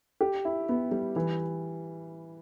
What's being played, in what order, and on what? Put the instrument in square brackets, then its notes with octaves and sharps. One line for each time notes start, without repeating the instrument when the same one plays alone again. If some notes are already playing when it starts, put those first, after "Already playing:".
[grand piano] G4
E4
B3
G3
E3